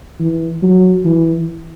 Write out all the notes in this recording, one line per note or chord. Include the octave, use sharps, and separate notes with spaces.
E3
F#3
E3